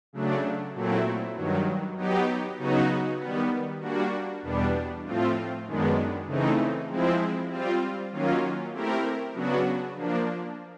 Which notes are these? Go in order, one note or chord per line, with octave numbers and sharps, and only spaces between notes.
C#3 F#3 A3 D4
A#2 F#3 A3 C4 E4
G2 D#3 F#3
F#3 B3 D#4 G4
C#3 F#3 B3 D#4 F#4
D#3 G3 B3
G3 A#3 D4 F#4
E2 B2 G3 B3 D4
A2 F3 A3 C4 F4
F#2 D#3 G#3 B3 D4
C#3 E3 A3 C4 D#4
F3 G#3 C4 E4
G3 C4 F4
D#3 F#3 A#3 C#4 F4
A3 C4 E4 G4 A#4
C#3 F#3 B3 D4 F#4
F3 A#3 D4